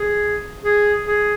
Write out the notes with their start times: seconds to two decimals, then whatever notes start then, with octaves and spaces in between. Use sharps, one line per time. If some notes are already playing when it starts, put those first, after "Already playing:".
Already playing: G#4
0.62 G#4
1.07 G#4